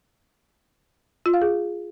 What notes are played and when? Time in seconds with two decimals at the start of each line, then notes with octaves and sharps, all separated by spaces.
1.26 F4
1.34 F5
1.42 G#4